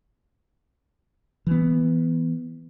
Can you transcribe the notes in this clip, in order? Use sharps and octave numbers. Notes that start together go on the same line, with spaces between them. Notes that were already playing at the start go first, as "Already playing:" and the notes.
E3 B3